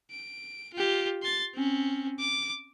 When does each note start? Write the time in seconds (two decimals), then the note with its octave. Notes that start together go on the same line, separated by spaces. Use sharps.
0.11 D7
0.74 F4 G4
1.23 C6 A6
1.54 C4 C#4
2.19 D6